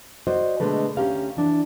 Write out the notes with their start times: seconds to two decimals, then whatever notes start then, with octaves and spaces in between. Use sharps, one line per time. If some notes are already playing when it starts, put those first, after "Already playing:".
0.27 F#4 C5 D5 D#5
0.60 B2 D3 G#3 A3 B4
0.97 D2 B2 C#4 G4 A#4 F5
1.37 E3 D4